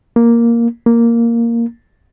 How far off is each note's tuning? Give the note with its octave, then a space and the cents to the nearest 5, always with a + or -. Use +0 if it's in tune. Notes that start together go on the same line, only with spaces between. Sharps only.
A#3 +0
A#3 -5